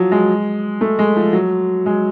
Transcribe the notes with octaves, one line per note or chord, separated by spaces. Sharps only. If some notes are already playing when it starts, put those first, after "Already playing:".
Already playing: F3 F#3
G#3
A3
G#3
F3
F#3
G#3